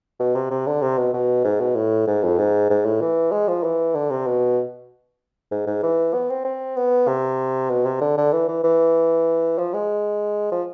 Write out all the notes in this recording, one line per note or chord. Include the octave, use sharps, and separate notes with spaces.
B2
C3
C3
D3
C3
B2
B2
G#2
B2
A2
G#2
F2
G#2
G#2
A2
E3
G#3
F3
E3
D3
C3
B2
G#2
G#2
E3
B3
C4
C4
B3
C3
B2
C3
D3
D3
E3
E3
E3
F3
G#3
F3